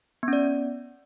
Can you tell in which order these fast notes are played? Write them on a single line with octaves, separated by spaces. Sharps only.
B3 C#4 D5